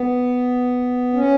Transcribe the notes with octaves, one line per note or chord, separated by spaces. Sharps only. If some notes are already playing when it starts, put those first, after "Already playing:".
Already playing: B3
C#4